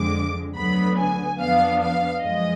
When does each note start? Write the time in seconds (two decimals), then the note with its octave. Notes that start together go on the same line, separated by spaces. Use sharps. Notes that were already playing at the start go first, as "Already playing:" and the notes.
Already playing: F2 D3 F3 G#3 D6
0.55 D2 D3 F#3 B3 B5
0.97 G#5
1.38 F2 F3 B3 D4 F5
1.81 F5
2.21 F#2 F3 G#3 D#5